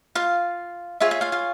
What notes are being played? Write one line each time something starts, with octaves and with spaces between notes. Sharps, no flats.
F4 F5
F4 G#4 C#5 E5
E5
F4 F5
F4 F5